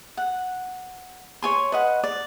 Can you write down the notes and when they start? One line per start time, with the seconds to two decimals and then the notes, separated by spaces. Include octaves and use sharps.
0.17 F#5
1.42 C#5 G#5 C6
1.72 B4 D#5 F#5
2.04 D5